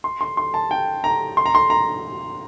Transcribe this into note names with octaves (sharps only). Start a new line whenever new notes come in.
C6
C6
C6
A5
G5
A#5
C6
A#5
C6
A#5